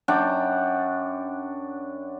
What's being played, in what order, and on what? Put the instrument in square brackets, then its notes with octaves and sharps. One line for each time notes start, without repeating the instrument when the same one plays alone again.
[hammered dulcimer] F#2 D4 F#5 G5